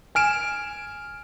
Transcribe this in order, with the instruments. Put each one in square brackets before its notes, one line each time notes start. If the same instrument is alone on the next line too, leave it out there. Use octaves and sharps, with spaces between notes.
[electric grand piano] G#5 F6 D7 E7